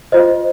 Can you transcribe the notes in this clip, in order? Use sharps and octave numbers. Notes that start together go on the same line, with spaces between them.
F4 C5 D#5